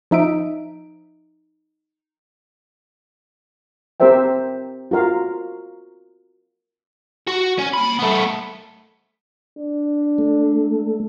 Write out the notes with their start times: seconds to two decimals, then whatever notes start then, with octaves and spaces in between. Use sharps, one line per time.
0.11 F3 D#4 E5 D7
4.00 C4 G4 A#4 C5 E5 G5
4.91 F4 F#4 A#4 F5
7.28 F#4
7.59 C#4
7.73 A#2 B5
7.99 A3 B3
9.58 D4
10.18 A3